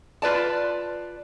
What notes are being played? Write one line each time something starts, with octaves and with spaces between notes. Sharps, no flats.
F4 B4 D5 A5